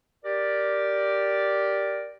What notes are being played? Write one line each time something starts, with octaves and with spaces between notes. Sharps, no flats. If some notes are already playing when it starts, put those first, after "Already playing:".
G4 A#4 D5